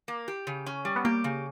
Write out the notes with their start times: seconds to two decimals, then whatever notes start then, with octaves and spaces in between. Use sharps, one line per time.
0.08 A#3
0.28 G4
0.47 C#3
0.66 C#4
0.85 G3
0.96 B3
1.05 A#3 G4
1.24 C#3